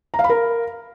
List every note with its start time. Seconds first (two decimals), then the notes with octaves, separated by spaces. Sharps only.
0.14 A#5
0.19 F5
0.24 B5
0.29 A#4